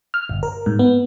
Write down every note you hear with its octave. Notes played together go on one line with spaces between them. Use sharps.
F6
G1
A#4
G#2
B3